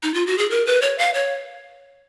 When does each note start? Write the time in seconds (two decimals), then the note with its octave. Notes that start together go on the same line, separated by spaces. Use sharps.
0.03 D#4
0.14 F4
0.27 F#4
0.38 G#4
0.50 A#4
0.67 B4
0.82 C#5
0.98 F5
1.14 C#5